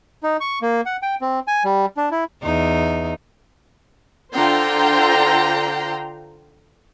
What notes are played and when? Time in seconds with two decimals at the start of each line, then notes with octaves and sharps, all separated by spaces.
0.23 D#4
0.40 C#6
0.62 A#3
0.86 F#5
1.02 G5
1.21 C4
1.48 G#5
1.65 G3
1.97 D4
2.11 E4
2.42 E2 D#4
4.35 D3 F4 C5 G5 A#5 C6